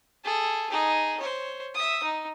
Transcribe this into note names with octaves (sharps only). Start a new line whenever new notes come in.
G#4 A4
D#4 G#4
C5 C#5
E5 D#6
D#4